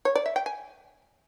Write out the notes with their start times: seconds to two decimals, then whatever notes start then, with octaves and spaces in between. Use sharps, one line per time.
0.05 C#5
0.15 D5
0.26 E5
0.36 G5
0.46 G#5